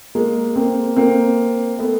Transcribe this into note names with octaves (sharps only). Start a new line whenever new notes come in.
G#3 A#3
A#3 C4
A#3 C4
A3 B3